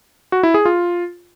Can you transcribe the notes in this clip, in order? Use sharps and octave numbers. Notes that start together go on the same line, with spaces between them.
F#4
E4
G#4
F4